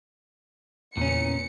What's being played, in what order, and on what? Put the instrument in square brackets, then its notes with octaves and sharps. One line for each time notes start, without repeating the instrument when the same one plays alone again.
[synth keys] E2 C#3 [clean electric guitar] A#2 C#4 [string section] C#7